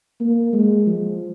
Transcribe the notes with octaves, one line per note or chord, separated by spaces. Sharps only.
A#3
G#3
F3